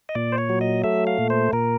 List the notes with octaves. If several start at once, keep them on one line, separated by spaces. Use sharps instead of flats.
D#5
A#2 D5
C5
C#5
F#3
D#5
A3 E5
F5
A#2
C5
A#2 A#4